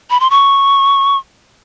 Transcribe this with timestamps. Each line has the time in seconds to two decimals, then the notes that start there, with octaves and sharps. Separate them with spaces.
0.10 B5
0.20 C6
0.30 C#6